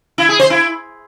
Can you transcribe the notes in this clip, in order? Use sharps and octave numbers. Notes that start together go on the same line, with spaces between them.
E4
G#4
C5
E4